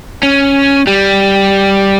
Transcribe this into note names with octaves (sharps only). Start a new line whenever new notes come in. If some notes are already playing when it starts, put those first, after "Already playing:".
C#4
G3